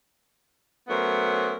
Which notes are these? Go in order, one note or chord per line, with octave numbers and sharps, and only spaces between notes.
F#3 A3 B3 C#4 A#4 C5